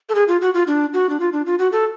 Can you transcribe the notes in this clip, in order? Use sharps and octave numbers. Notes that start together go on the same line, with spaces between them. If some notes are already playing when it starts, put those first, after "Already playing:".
A4
G#4
F4
F#4
F4
D4
F#4
D4
F4
D4
F4
F#4
A4